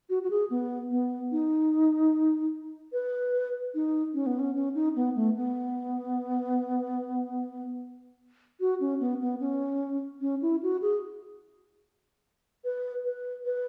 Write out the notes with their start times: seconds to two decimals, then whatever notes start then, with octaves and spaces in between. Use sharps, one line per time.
0.10 F#4
0.23 F#4
0.30 G#4
0.50 B3
0.90 B3
1.32 D#4
2.93 B4
3.75 D#4
4.14 C#4
4.26 B3
4.39 C#4
4.55 C#4
4.75 D#4
4.96 B3
5.16 A3
5.36 B3
8.60 F#4
8.80 C#4
9.00 B3
9.21 B3
9.40 C#4
10.21 C#4
10.42 E4
10.63 F#4
10.82 G#4
12.64 B4
13.05 B4
13.45 B4